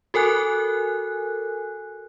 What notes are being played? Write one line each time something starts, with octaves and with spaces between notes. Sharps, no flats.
F#4 A4 A#4 G#5 F#6